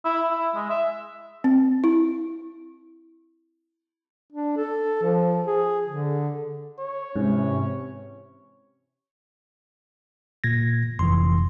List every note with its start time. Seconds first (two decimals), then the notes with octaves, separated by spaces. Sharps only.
0.05 E4
0.31 E4
0.56 G#3
0.70 E5
1.44 C4
1.84 E4
4.33 D4
4.57 A4
5.03 F3
5.47 G#4
5.88 D3
6.79 C#5
7.16 G#2 C3 E3 C#4
10.44 A#2 G#6 A#6
10.99 F1 E3 C6